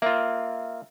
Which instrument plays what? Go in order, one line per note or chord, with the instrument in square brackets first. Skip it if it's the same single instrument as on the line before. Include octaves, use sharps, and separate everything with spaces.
[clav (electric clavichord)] A#3 F4 [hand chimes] E5